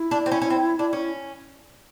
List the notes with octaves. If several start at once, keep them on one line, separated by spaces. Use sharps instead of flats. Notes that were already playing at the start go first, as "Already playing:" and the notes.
Already playing: E4
D4
C4
C#4
C#4
C4
D4
C#4